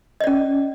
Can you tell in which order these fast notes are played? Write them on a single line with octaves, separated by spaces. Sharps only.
D#5 D5 C#4